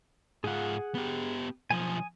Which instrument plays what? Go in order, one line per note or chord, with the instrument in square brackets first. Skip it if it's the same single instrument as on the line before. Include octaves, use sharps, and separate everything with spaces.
[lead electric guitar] G#2 F4 [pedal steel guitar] G#4 F#5
[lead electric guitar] B3 G4
[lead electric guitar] B1 F3 [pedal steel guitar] G#5 D#6